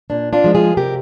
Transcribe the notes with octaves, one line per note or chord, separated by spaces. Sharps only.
A#2 D4
D4 F4
F3 G#3
F4 G#4
C3 G4 A#4